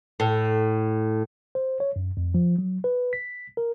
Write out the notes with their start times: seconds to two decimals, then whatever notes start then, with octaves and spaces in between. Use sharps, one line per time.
0.20 A2
1.55 C5
1.80 C#5
1.96 F#2
2.17 F2
2.34 F3
2.58 F#3
2.84 B4
3.13 B6
3.57 A#4